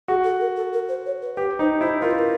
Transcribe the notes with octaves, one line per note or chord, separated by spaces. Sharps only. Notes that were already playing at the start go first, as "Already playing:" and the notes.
F#4 G#4
A4
A#4
A4
A#4
C5
C#5
B4
G4 B4
D#4 C5
E4 C5
F4 A#4
B4
A#4